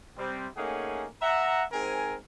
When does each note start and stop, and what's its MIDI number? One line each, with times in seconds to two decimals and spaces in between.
0.18 0.48 48
0.18 0.48 55
0.18 0.48 60
0.57 1.06 57
0.57 1.06 58
0.57 1.06 61
0.57 1.06 63
0.57 1.06 68
0.57 1.06 78
1.22 1.64 76
1.22 1.64 78
1.22 1.64 82
1.72 2.15 44
1.72 2.15 60
1.72 2.15 70
1.72 2.15 80